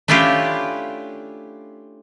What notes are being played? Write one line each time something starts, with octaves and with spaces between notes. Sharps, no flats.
A3 C#4 D4 E4 F4 G4